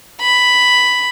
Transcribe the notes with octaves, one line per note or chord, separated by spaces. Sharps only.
B5